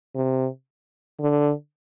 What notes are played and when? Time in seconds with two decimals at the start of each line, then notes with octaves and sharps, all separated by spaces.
0.15 C3
1.20 D3